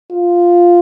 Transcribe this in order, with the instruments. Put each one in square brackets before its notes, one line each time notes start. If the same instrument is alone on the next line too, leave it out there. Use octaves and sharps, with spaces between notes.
[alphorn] F4